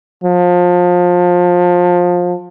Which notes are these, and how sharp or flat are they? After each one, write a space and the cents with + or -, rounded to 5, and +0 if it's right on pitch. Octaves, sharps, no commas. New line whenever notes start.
F3 +25